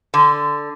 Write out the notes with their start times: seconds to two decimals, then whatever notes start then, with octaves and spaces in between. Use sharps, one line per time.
0.14 D3